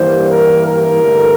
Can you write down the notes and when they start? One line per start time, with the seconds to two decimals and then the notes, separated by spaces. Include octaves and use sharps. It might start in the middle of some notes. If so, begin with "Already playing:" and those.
Already playing: G2 E3 G3 A#3 C5
0.30 A#4
0.66 A#4
1.02 G2 D3 A3